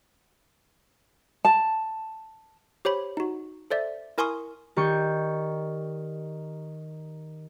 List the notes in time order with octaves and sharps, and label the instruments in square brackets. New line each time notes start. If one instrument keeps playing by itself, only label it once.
[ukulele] A5
[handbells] G4 C5 C#5 B5
D#4 F#4
A4 C5 D5 E5
E4 A#4 G#5 C6 C#6 D#6
[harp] D#3 G4 D5 C#6 G6